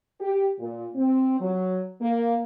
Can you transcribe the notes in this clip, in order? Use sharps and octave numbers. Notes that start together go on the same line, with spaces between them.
G4
A#2
C4
F#3
A#3